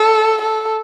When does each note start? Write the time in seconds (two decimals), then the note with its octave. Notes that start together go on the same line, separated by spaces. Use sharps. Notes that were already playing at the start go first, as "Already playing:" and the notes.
Already playing: A4
0.41 A4